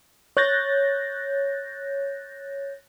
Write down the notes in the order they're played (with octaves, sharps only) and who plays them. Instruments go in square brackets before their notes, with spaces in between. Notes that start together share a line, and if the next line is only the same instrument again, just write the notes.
[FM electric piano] C#5 F#6 G6 A6 A#6